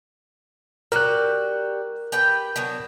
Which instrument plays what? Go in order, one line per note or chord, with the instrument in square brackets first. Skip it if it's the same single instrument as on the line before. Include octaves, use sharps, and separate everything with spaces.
[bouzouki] G3 F#4 G4 [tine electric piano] A#4 F#6
[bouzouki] G4 B4 G5
D3 F#3 B3